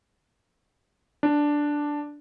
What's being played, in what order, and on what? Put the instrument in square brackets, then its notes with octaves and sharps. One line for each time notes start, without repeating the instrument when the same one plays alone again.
[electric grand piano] D4